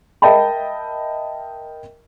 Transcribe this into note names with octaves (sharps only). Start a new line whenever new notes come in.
A#4 D#5 E5 G5 A5 B5